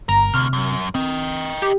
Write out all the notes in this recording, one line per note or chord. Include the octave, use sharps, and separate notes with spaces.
G1 A#4 A#5
D2 C3 F6
F#2
C4 D#5 G5
G4